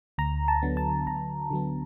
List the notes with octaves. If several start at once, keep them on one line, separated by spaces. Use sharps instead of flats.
D2 A#5
A5
D3 F#3 B3
A5
D2 A#5
D3 F#3 B3